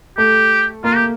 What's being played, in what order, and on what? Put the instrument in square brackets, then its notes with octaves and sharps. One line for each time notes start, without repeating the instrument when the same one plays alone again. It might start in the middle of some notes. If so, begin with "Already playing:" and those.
[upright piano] A3 [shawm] G4
[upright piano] A#3 [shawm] F4
[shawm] G4